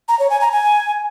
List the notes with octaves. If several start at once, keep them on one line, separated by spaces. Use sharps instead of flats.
A#5
C#5
G#5
A#5
G#5